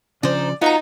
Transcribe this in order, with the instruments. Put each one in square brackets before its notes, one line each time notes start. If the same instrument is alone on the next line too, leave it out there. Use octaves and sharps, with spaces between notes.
[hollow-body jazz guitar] C#3 F3 D4 [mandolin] D#4 C5 [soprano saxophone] D5
[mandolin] B3 F#4 A#5 [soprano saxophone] D#4 [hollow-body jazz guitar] F4